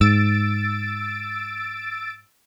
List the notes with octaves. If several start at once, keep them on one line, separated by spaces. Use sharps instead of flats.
G#2 E6 A6 D7